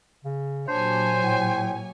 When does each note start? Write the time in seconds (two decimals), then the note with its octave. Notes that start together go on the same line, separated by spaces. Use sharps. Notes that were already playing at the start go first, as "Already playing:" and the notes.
0.25 C#3
0.69 A#2 F#3 D4 G4 C5 C#5 G#5
1.19 A2